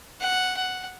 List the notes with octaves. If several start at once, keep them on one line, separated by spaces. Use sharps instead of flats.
F#5
F#5